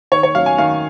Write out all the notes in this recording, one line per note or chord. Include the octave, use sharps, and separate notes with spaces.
D#3 C#5
C#5
F#3 C#4 F5
G#5
D#3 F5